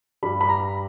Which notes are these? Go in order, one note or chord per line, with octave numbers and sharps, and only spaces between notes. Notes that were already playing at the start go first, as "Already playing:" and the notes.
G2 G3 B5
B5
A#5